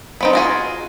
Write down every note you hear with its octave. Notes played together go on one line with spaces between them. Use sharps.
B3 C4 D#4
F4 F#4 G#4